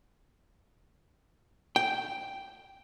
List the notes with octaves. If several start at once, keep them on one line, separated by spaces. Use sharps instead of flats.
G5